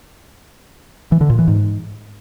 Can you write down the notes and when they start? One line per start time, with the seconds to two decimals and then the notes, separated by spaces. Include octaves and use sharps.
1.12 E3
1.21 D3
1.30 A#2
1.39 E3
1.48 G#2